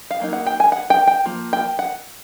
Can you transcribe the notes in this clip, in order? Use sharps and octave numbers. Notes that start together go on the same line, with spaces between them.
F5
F#3 A#3 D#4
F#5
G5
G#5
F#5
G5
G5
F3 A#3
G5
F#5